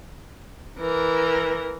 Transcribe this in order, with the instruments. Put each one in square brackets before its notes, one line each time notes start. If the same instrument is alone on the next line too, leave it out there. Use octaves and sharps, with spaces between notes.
[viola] E3 A#4